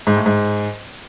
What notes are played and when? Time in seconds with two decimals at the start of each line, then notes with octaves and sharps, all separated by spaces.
0.07 G#2
0.16 A2
0.26 G#2